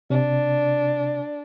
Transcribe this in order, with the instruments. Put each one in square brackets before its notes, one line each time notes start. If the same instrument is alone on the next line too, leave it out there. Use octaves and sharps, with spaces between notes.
[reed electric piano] C3 [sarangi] D4